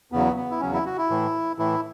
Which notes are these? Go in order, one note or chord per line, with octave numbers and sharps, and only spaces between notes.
E2 C#3 F#3 B3
B3
E4
E2 C#3 F#3 C#4
E4
F#4
E4
A2 E3
A2 E3 E4